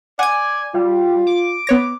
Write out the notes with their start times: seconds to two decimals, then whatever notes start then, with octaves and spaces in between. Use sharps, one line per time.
0.19 D5 F#5 G#5 G#6
0.74 G3 F4
1.27 D6
1.67 B3 C#5 A#6